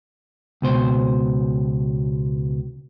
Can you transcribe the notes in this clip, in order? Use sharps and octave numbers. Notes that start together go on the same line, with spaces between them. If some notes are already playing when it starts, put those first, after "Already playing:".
C#2 B2 C5